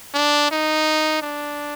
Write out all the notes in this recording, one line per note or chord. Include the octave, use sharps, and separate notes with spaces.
D4
D#4
D4